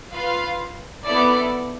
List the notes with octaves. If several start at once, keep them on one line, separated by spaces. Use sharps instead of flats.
F4 B4 F5
B3 E4 A4 D5